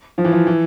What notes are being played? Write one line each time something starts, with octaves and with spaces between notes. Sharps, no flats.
F3
E3
F3
E3